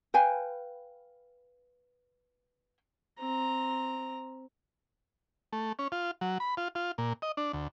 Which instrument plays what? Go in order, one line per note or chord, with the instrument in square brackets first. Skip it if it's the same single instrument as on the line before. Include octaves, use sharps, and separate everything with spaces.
[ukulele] B4 F5 G5 G#5
[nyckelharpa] C4 A#5
[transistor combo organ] A3
C#4
F4
F#3
B5
F4
F4
A#2
D#5
D4
D2